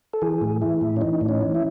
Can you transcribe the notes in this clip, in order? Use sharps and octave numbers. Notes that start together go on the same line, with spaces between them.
A4
E3 G#4
A2
E3 E4
A2
C#4
E3 D#4
A2
C#4
E3
E4